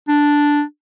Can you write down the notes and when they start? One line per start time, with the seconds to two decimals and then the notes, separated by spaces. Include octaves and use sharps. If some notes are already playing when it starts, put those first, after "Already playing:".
0.08 D4